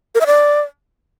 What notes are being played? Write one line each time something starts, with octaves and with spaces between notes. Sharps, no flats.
A#4
E5
D5